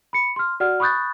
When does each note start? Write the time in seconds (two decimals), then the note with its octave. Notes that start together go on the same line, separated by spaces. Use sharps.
0.13 B5 C#7
0.36 C6 F6
0.60 F#4 D5 F#5 F6
0.80 B5 C#6 D#6 F#6 G6 A6